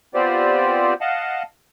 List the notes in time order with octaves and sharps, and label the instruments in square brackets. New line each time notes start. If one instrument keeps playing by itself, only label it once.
[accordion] B3 C4 F4 G4 C5 D5
D#5 F5 F#5 A5